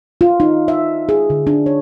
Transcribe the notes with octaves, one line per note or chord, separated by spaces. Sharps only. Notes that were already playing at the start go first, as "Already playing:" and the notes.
F4
D#4
E5
G#4
D3
D4
C#5